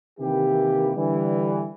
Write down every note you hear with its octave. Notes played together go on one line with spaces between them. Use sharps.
C3 D#3 E3 A#3 E4 G4
D3 E3 G3